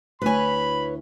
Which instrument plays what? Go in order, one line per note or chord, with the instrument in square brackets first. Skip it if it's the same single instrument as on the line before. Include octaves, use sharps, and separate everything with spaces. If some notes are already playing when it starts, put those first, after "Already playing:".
[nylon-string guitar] D2 E4 G#5 [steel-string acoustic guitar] B4 C#5 [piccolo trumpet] B5